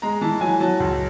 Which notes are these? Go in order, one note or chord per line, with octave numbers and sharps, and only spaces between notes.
G#3 A#5
E3 A5
F#3 G#5
F#3 A5
C#2